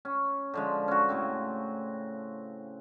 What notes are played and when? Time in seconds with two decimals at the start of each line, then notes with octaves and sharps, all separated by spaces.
0.05 C#4
0.54 D3 F3 G#3
0.88 C#4 F#4
1.09 A2 C#3 C4